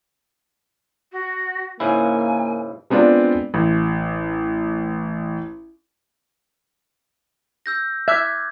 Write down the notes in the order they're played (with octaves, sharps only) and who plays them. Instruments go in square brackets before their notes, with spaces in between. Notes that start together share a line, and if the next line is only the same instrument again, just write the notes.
[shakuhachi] F#4
[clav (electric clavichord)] G#2 C#3 E4 [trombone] A#3 [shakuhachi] G#5
[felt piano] G#3 B3 C4 D4 F4 D5
A1
[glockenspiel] E6 G6 A#6
[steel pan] E5 [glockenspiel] D6 F#6 G#6